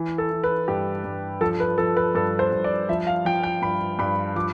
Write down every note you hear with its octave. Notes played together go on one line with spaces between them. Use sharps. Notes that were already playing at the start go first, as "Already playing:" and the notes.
Already playing: E3
A4
E3
B4
G2 G4
G2
F3 A4
B4
F3 A4
B4
G2 A4
C5
G2
D5
F3 E5
F5
F3 G5
G5
G2 B5
G2 B5
F3 D6